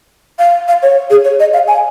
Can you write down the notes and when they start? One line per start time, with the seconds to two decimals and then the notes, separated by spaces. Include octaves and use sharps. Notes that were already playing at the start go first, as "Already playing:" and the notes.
0.39 F5
0.68 F5
0.83 C#5
1.10 G#4
1.25 C#5
1.40 D#5
1.53 F5
1.68 G#5